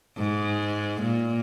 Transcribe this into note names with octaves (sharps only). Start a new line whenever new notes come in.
G#2
A#2